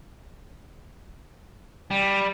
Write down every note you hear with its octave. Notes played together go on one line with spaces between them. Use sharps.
G3